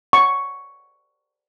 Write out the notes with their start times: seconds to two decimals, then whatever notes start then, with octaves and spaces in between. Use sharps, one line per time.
0.13 C#6